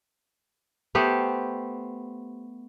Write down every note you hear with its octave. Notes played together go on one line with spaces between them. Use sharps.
A3 B3 G4 C5